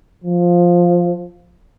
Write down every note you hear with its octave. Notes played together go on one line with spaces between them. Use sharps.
F3